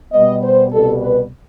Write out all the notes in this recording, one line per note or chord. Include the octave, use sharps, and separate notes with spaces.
B2 G3 B3 D#5
C5
C2 B2 G3 A4
B4